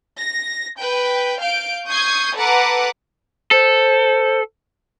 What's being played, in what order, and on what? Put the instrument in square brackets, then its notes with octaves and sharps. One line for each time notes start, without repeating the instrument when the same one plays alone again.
[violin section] A#6
B4 G5
F5 G6 D7
C#6 D#6 G6 G#6 C7
A4 B4 F#5 A#5 D6
[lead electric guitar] A4 [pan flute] C5